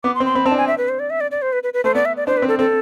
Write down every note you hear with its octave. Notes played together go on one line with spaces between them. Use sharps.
B3 D6
C6
C4
C6
C4 B5
C4 A5
D4
G#5
E5
B4
C5
D5
E5
D5
D5
C5
B4
B4
B4
A3 C5
B3 D5
E5
D5
D4 C5
B4
C4
A4
C4 A4